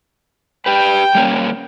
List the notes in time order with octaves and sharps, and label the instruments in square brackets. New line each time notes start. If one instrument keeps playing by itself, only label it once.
[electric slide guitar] G4 B4 [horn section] G5
[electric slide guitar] G3 A#3 C#4